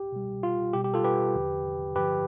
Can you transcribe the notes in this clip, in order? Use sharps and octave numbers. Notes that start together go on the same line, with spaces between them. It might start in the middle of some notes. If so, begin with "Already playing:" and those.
Already playing: G4
B2 G3
F4
B2 G3 G4
G4
F4 A4
G4 B4
E2 D3 F3
G2 D3 F3 G4 B4